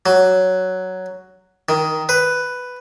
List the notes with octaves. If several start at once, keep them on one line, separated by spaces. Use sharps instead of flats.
F#3
D#3
B4